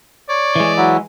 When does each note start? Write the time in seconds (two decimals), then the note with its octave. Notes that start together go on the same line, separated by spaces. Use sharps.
0.29 C#5 D5
0.56 E3 G#3
0.77 F#3 E4